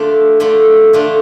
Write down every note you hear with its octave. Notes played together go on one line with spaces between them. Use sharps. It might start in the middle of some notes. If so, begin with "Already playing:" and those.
Already playing: D3 A3 D4 F4
D3 A3 D4 F4
D3 A3 D4 F4